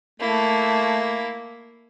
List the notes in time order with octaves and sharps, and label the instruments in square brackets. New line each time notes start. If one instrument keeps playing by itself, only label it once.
[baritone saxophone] A3 [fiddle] A#3 E4